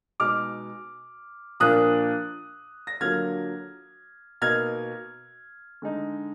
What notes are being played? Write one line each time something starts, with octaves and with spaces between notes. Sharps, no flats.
B2 G#3 D#4 D6 F6
A#2 F3 A#3 D4 F4 D#6 F#6
A#6
D3 F#3 A#3 F4 F6 G#6
B2 A#3 D#4 F6 G#6
D3 G#3 D#4